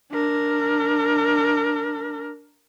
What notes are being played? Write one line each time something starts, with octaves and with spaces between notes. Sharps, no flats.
D4 A#4